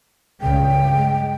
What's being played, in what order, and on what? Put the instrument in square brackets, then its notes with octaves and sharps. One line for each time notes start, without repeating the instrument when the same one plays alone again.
[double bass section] C#2 G2 C#3 [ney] G5
[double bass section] G#3